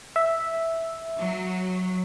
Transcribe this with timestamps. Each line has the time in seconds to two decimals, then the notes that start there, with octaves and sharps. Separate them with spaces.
0.16 E5
1.19 F#3